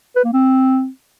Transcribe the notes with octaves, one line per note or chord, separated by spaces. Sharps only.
B4
A#3
C4